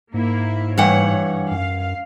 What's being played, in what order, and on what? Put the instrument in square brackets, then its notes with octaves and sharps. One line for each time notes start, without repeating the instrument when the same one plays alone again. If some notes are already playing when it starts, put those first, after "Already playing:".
[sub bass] G#2 [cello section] A#3 E4
[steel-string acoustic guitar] G2 E3 F#5 [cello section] C#5
[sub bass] F#2 [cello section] F5